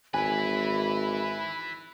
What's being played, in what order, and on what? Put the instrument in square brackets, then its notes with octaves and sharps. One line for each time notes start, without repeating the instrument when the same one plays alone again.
[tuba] G#1 [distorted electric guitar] E4 B4 [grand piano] G#5 [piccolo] B5